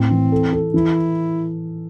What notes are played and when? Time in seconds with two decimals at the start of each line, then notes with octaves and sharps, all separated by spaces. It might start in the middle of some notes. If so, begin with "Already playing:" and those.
Already playing: A2 C4
0.11 E3
0.32 A4
0.53 A4
0.74 E3 E4